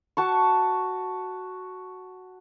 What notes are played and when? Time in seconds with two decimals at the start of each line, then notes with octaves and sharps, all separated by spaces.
0.17 F#4 A5 C#6